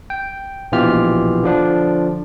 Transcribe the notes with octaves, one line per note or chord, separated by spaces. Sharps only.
G5
A#1 B2 E3 F4 G4 F6
D3 F3 D4